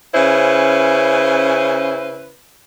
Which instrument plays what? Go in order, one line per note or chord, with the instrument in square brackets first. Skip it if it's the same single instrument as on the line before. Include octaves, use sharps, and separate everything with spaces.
[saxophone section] C#3 C#4 E4 B4 C5